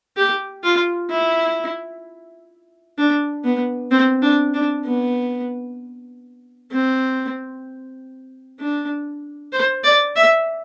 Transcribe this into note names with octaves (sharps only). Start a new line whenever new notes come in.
G4
F4
E4
D4
B3
C4
D4
D4
B3
C4
D4
C5
D5
E5